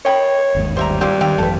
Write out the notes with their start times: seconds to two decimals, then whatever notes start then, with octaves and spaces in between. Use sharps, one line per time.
0.05 C#5 D#5 G5 B5
0.55 G1 D#2 G#2
0.77 G3 C5 E5 A#5
1.01 G3 C4 F4 G4
1.21 D#3 C4 G4 F5
1.38 G#1 F#2 E3 A4 B4